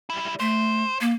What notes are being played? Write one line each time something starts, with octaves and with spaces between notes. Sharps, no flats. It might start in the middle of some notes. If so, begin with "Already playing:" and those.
G3 E4
A3 C5
A#3